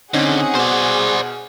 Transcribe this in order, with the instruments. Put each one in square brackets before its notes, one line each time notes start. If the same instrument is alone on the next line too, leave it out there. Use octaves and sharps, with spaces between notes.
[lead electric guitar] D3 [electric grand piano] C4 C#4 D#4 [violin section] G#4 F#5
[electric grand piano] B2 [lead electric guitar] C5 D5